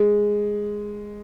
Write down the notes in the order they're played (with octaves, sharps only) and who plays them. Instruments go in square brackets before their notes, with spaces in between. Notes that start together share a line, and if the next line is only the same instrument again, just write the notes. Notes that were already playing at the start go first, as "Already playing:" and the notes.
Already playing: [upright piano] G#3